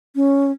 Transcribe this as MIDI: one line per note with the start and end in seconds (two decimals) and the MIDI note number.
0.16 0.51 61